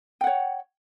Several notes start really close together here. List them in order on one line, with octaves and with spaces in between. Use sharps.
G5 F#5 C#5